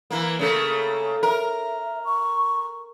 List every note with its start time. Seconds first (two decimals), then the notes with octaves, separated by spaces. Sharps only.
0.11 E3 A#3
0.39 C#3 A3 A#3
1.23 A#4 E5
2.05 C#6